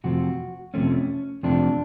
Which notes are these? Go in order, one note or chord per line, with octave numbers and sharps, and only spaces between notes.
F2 C3 F3 A3 C4 F#4
F2 C3 F3 A3 C4 C#4
F2 C3 F3 A3 C4 D4